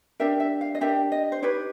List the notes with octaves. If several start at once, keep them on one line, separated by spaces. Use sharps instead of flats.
D4 G4 A#4 E5
E5
F5
D#5
D4 G4 A#4 E5
D#5
C5
D#4 G4 B4 C#5